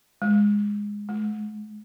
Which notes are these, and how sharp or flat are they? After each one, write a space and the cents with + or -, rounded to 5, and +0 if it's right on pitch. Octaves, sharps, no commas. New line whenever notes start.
G#3 -10
G#3 +40